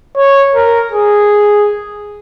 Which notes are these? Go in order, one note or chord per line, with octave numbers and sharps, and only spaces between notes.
C#5
A#4
G#4